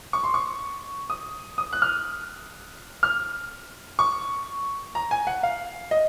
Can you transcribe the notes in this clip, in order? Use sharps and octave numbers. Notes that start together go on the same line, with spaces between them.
C#6
C6
C#6
D#6
D#6
F#6
F6
F6
C#6
A#5
G#5
F#5
F5
D#5